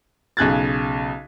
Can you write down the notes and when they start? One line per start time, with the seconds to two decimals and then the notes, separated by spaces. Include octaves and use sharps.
0.37 B1 C#3 G#4 F#6 G#6 A6